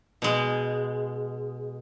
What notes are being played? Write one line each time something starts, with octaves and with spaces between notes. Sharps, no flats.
B2 G#3